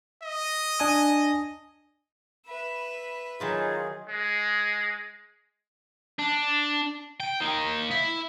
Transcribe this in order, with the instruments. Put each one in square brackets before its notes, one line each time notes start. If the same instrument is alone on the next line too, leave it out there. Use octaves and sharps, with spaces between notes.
[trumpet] D#5
[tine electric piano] D4 G#5 D#6
[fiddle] B4 E5 [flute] B5
[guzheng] D#3 F#3 B5 [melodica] D#4 F4 [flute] G#4
[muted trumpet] G#3
[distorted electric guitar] D4
G5
A#3 D#4
E4 E5